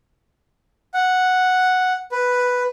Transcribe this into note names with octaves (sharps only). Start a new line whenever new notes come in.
F#5
B4